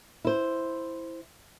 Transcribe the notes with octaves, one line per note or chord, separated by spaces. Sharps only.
E4 C5